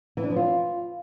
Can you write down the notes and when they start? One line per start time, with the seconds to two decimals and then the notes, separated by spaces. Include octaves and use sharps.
0.17 E3
0.23 D4
0.30 F3
0.36 F4